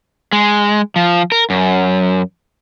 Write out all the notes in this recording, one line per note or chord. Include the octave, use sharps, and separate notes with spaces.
G#3
F3
A#4
F#2